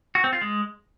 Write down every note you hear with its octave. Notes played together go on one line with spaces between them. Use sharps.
F#4
C4
F4
G#3